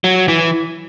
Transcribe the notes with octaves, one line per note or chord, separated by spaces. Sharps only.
F#3
E3